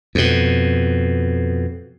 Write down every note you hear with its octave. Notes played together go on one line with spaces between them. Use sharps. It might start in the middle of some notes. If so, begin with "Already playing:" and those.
F2 B2